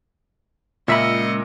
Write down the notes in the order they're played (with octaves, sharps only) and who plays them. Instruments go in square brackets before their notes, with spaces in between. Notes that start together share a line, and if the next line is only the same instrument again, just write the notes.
[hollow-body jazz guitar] C#2 E5 B5 [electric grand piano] A#2 A#4 E6 [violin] D#5 C#7